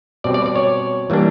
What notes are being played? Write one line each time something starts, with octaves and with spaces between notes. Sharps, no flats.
B2 G3 C4 D5
D5
D5
C#5
E3 G3 A#3 D4